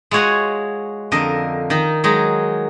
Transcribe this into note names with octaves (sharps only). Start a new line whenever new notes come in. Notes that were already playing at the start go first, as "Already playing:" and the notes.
G#3 F4 F#4 C#5 F#5 G#5
F2 D3 A#4 D#5
D#3 D#4
F#3 G#3 D#4